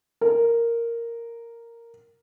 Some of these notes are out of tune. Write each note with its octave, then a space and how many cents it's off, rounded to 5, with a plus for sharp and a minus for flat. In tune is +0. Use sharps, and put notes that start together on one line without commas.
A#4 -5